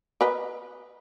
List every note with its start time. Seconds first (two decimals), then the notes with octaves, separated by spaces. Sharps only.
0.21 A#4 B4 D#5